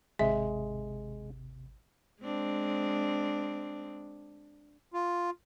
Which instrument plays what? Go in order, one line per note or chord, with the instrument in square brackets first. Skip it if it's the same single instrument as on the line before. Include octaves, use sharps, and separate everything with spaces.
[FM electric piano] G#1 [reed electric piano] D#2 C3 [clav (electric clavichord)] G#3 [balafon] E5
[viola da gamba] G#3 C4 D4
[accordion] F4